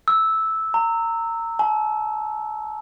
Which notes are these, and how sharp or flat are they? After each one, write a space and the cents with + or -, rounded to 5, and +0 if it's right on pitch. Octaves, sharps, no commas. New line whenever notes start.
E6 -10
A#5 -25
A5 -45